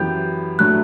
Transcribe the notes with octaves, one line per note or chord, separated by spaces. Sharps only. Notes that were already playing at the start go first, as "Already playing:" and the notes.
Already playing: F#2 E3 B3 E4 G4 G6
A2 F#3 A3 D4 F#6